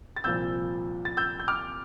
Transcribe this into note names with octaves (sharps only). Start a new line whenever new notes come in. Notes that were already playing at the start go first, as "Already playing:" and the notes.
A6
C2 A#2 F3 E6 G6
A6
E6 G6
G6
D6 F6